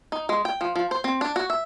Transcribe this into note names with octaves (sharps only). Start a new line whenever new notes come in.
D#4
G#3
G5
F3
F3
C5
C4
D4
F#4
E5